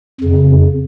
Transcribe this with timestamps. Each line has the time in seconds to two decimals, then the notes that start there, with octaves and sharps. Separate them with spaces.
0.21 F2 C#3